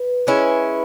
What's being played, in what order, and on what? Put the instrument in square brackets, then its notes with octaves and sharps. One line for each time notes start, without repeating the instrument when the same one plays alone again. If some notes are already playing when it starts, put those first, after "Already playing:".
Already playing: [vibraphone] B4
[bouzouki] G#3 C#4 E4